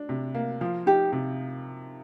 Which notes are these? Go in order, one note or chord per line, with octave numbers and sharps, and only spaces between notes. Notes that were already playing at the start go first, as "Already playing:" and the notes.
Already playing: D4
C3
A#3
F3 F4
D#4 G4
C3